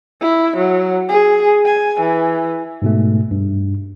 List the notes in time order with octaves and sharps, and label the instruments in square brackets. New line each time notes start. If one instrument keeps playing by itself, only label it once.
[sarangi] E4
F#3
G#4
G#5
E3
[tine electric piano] G#2 B2 A3
G2